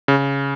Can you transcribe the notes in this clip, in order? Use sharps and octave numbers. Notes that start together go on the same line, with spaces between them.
C#3